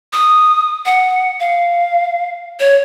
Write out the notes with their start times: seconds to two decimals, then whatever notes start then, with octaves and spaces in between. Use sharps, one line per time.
0.13 D#6
0.85 F#5
1.40 F5
2.60 C#5